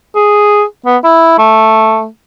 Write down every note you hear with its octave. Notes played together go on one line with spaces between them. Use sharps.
G#4
B3
E4
A3